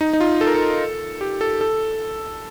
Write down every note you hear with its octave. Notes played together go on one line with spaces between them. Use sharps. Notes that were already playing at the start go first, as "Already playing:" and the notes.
D#4
D#4
F4
A4
A#4
A4
G4
A4
A4